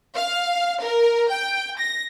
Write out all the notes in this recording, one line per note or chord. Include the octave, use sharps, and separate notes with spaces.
F5
A#4
G5
A#6